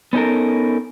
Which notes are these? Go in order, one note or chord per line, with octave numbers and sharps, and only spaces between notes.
B3 C#4 D#4 A4 A#4